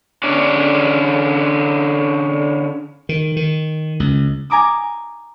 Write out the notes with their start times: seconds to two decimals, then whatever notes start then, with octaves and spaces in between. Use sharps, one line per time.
0.23 D3 C#4 G#4 D5
3.09 D#3
3.36 D#3
4.00 C#2
4.50 G#5 A#5 D6 D#6